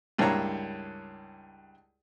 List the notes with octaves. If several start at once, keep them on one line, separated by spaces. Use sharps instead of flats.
C#2 G2 A#3 E4 C#5 A#5